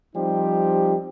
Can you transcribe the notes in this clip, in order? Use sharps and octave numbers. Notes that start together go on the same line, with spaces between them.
F3 G3 C4 D#4 G4